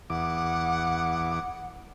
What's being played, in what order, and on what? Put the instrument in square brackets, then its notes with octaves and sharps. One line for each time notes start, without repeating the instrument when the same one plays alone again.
[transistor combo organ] E2 D6 [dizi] F#5